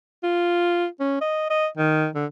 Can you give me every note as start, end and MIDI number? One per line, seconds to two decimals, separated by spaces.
0.23 0.86 65
1.00 1.17 61
1.21 1.50 75
1.50 1.67 75
1.77 2.07 51
2.15 2.26 50